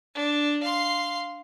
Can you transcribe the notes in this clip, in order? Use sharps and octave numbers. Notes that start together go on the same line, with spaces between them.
D4
F5 C6